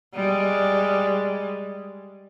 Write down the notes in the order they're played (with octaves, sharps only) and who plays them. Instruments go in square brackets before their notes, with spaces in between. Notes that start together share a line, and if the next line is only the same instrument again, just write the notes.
[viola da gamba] G3 G#3